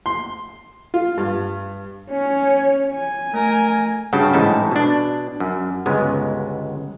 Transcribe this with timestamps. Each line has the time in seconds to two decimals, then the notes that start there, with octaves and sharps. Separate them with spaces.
0.06 C6
0.94 F4
1.18 G2
2.10 C#4 C#5
2.94 G#5
3.34 A3 A#4
4.13 G2 C#3 F#4 G5 A5
4.33 A1 G#2 D#4 E4 A5
4.72 B2 D4
5.40 F#2
5.86 G1 C#2 G#3 B3